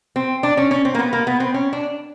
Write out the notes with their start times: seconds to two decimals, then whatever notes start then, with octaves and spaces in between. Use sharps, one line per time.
0.16 C4
0.43 D4
0.57 C#4
0.71 C#4
0.85 C4
0.95 A#3
0.99 B3
1.13 A#3
1.27 B3
1.40 C4
1.54 C#4
1.73 D4